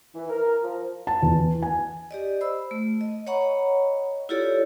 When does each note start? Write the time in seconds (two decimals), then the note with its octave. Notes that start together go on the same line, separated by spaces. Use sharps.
0.15 E3
0.30 A#4
0.63 F3
1.07 A5
1.22 E2
1.63 G#5
2.11 G4 D5 D#5
2.41 C5 B5 E6
2.71 A3
3.01 D#5
3.27 C#5 D#5 F#5 A#5 B5 C#6
4.29 E4 F4 G4 A4 C#5 D5